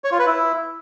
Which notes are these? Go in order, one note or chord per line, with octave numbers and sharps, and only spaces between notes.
C#5
F4
B4
E4